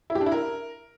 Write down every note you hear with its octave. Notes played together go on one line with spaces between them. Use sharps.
E4
G4
D4
E4
A#4